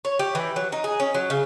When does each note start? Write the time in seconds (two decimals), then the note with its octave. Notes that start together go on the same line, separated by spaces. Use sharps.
0.05 C#5
0.19 G4
0.35 E3
0.56 F#3
0.72 D#4
0.84 G#4
1.00 C#4
1.15 F#3
1.30 C#3